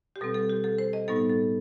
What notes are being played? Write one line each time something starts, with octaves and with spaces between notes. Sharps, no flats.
G4
B2 G3 C4 A4
A4
G4
A4
C5
D#5
A2 G3 B3 D#4 A4
A4